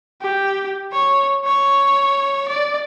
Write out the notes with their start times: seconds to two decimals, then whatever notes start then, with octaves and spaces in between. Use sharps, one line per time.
0.21 G4
0.92 C#5
1.45 C#5
2.48 D5